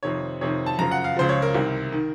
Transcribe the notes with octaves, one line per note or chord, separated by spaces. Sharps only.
F2 C3 D#3 C#5
F2 C3 D#3 C#5
A5
F#2 C#3 F3 A#5
F#5
F5
C#2 C#3 F3 C5
C#5
A#4
C2 C3 D#3
D#3